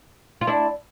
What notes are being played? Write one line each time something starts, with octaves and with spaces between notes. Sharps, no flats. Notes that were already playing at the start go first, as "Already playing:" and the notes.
F4
D4 E4